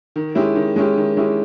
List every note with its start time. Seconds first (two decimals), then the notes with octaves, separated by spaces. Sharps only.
0.16 D#3
0.35 G#3 C#4 E4 G4
0.55 D#3
0.76 G#3 C#4 E4 G4
0.97 D#3
1.17 G#3 C#4 E4 G4